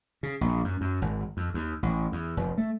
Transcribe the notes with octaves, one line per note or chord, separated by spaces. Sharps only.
C#3
A#1
F#2
F#2
G#1
F2
D#2
A1
E2
F1
A3